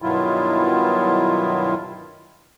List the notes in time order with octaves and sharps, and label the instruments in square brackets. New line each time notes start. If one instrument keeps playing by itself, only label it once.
[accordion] G2 B2 D#3 F#3 E4 F4